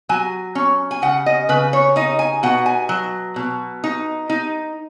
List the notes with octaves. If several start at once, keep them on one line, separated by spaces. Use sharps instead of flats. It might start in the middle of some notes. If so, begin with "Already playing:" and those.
F#3 G#5
C#4
G#5
C#3 F#5
D#5
C#3 B4
C#5
D#4 D#5
G#5
B2 F#5
G#5
F#3
B2
D#4
D#4